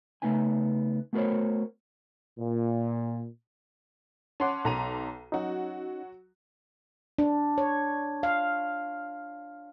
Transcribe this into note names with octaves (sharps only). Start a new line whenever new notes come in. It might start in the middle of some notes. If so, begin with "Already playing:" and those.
C#3 F3 A3 B3 D#4 G#5
A3 B3 F#4 A#4 C5 C#5
A#2
C#4 F#5 A5 C6 D6
B1 A#5 D#7
F#3 C#4 D#4 F#4
D4
C#5
F5